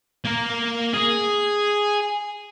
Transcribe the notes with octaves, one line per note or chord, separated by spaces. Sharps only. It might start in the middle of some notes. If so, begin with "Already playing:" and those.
A#3 A#4
G#4